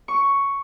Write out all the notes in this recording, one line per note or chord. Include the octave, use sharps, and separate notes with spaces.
C#6